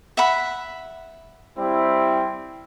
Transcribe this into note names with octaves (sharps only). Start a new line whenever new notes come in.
E5 F#5 B5
G3 C4 E4